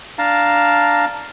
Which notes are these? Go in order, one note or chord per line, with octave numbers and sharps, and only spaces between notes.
D4 F5 A5 A#5